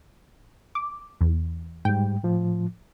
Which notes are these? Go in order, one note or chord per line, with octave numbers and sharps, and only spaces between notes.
D6
E2
G#2 G3 G5
A2 F3